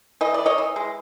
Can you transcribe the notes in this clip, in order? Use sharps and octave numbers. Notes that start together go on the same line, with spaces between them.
E3 D#5
E3 D5
C#5 D#5
E3
G#3